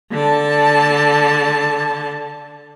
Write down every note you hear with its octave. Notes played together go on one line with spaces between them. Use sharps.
D3 A5